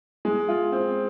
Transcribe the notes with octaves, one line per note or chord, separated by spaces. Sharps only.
G#3
F4
C4